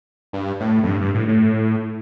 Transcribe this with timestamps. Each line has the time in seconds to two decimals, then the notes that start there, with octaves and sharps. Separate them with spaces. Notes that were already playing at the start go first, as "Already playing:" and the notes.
0.33 G2
0.60 A2
0.83 F2
0.88 G2
1.01 G2
1.15 A2
1.28 A2